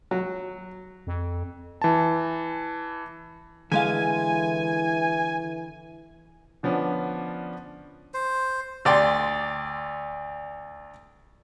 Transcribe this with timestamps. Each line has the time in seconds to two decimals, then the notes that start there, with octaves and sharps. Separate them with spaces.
0.11 F#3
1.07 F2
1.82 E3 A5
3.72 D3 E3 G#3 F5 G#5
6.63 D3 F3 B3 C#4 D4
8.14 C5
8.85 D2 D5 G5 C6